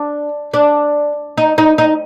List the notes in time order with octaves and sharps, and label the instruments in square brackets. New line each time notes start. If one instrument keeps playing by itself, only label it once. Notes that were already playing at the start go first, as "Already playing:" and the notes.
Already playing: [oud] D4
D4
D#4
D#4
D#4